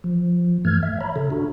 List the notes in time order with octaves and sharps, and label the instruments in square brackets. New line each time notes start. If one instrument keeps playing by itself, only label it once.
[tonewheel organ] F3
G2 E3 A3 F6 G#6
E5
C#5 A#5 B5
C#3 A4
D4 F#4